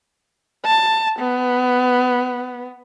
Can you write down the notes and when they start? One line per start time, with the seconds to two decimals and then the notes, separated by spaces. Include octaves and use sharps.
0.65 A5
1.19 B3